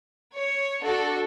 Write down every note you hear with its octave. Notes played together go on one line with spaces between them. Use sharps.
C#5
D4 F#4 A4